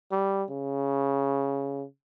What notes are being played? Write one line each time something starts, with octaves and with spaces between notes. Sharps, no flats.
G3
C#3